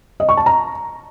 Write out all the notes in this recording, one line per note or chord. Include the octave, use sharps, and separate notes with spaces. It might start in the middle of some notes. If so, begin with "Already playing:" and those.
D#5
C#6
A5
A#5